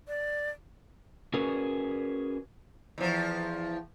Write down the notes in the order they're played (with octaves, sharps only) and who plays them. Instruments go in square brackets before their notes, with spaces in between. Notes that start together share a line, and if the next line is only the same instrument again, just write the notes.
[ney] D5
[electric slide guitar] C#4 F#4 G#4 A#4 B4
[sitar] E2 F3